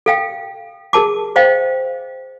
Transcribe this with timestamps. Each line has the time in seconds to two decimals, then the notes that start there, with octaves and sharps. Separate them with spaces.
0.06 A4 F5 G5
0.93 G#4 A#4 A5 D6
1.36 C5 D#5 F5 G5